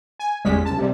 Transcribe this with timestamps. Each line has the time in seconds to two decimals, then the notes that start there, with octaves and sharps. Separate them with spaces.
0.19 G#5
0.45 G1 E2 G3 G#3 C#4 B6
0.65 C2 A5
0.78 C3 G3